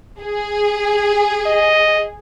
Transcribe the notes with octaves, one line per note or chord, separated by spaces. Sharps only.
G#4
D#5